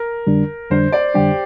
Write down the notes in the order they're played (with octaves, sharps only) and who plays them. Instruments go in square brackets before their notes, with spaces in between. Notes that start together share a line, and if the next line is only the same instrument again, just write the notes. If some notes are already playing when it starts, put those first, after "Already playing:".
Already playing: [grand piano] A#4
[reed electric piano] F2 D3 G3 D4
[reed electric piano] F2 D3 G3 D4 [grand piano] C5
[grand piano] D5
[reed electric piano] F2 D3 G3 D4 [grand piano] G4